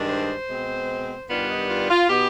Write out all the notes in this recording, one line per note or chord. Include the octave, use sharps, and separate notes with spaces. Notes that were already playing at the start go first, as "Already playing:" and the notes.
Already playing: G2 D#3 G#3 D4
C5
B2 G#3 C4
G2 D#3 G3 B3 D4 F4
D#4
F4
F4
B2 B3 D#4 G4